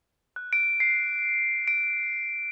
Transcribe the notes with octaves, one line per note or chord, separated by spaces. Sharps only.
F#6
D7
C7
D7